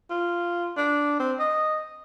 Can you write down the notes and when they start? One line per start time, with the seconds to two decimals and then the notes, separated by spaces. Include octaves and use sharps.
0.10 F4
0.77 D4
1.20 C4
1.39 D#5